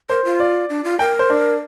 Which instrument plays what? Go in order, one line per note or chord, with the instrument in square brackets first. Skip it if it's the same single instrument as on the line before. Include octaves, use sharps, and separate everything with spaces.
[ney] A#4 [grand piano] C5
[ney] F4
[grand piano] D5
[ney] D4
F4
[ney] A#4 [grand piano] G5
[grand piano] C5
D4